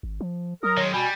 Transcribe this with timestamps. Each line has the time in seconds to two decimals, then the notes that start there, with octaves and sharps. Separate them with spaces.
0.03 G#1
0.21 F3
0.63 F#3 A#4 D#6
0.77 D#3 G#3 C#5
0.93 B2 G3 G#5 B5